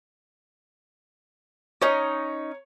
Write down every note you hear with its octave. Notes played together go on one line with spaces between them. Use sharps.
C#4 D#4 C#5